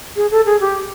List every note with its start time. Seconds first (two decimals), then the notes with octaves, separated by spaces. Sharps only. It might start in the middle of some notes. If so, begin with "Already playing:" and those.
0.16 G#4
0.31 A4
0.46 G#4
0.60 G4